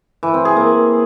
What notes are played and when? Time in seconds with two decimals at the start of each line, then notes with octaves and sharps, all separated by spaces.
0.23 E3
0.34 C4
0.45 G#4
0.56 A#3